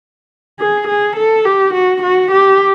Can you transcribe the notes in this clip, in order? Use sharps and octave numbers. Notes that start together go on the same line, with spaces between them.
G#4
G#4
A4
G4
F#4
F#4
G4